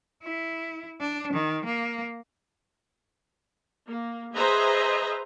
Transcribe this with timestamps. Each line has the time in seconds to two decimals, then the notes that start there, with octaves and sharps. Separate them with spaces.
0.23 E4
1.00 D4
1.33 D#3
1.65 A#3
3.87 A#3
4.34 G#4 B4 C5 D#5 E5 A#5